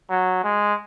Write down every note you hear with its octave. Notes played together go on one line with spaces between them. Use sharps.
F#3
G#3